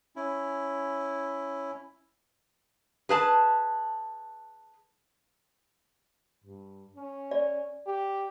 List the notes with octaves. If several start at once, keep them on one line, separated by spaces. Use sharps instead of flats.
C#4 E4
G#4 B4 A5
G2
C#4
D5
G4